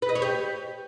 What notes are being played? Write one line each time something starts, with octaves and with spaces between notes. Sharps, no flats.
B4
D#5
C#5
G4